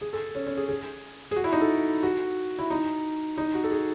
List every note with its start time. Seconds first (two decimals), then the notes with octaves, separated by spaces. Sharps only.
0.01 G#4
0.13 A4
0.35 C#4
0.46 C#4
0.57 G#4
0.69 G#4
1.31 G#4
1.36 F#4
1.44 E4
1.53 D#4
1.61 A4
2.03 F#4
2.59 E4
2.70 D#4
3.37 D#4
3.54 F#4
3.64 A4
3.72 G#4